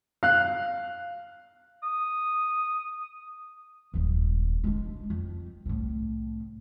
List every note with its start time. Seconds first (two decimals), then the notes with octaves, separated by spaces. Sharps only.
0.23 F5 F#6
1.83 D#6
3.94 D#1 F#2
4.64 G#3 D4
5.10 F2
5.66 C2 A2